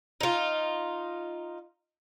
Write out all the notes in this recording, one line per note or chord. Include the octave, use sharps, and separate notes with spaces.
D#4 F4